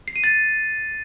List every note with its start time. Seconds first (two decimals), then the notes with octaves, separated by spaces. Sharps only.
0.08 C7
0.16 D#7
0.24 A6